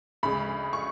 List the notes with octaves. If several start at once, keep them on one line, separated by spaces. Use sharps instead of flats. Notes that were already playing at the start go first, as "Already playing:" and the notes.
D2 C#3 G#3 B5
C#6